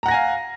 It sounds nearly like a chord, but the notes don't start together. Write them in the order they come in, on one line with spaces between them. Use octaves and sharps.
A#5 F#5 A#6 G#5 F5